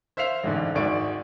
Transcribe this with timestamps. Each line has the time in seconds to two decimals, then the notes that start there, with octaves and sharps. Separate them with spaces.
0.17 C5 E5 F5 C7 F7
0.43 A1 G#2 D3
0.75 G#1 G#2 D5 E5 C#6 D7